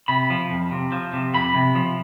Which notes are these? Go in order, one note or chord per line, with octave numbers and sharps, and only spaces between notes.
C3 B5
F3
F2
C3
F3
C3
F2 B5
C3
F3